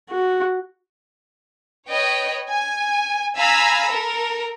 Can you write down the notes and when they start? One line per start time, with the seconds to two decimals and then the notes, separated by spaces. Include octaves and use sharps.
0.10 F#4
1.88 B4 C#5 D#5 G5
2.48 G#5
3.35 F5 G#5 A#5 B5 E6
3.89 A4 A#4